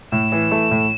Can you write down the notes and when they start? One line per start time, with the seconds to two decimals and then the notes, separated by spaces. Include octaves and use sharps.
0.12 A2 E7
0.32 E3
0.51 A3
0.71 A2